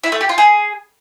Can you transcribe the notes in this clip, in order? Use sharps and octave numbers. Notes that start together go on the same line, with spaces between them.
E4
A3
G4
F4
G#4